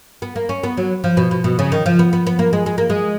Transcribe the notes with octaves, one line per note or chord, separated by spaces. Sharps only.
B3
A#3
C#4
B3
F#3
F3
B2
B2
B2
C#3
D#3
F3
B3
B3
B3
A#3
G#3
G#3
A#3
G#3